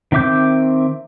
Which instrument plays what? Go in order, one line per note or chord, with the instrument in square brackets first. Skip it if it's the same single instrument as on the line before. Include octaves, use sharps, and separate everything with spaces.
[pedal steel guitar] D#3 C4 E5 D6 G6